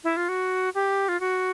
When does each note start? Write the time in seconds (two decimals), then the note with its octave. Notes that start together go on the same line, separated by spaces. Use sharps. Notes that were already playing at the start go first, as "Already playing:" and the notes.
0.04 E4
0.17 F4
0.29 F#4
0.75 G4
1.09 F4
1.20 F#4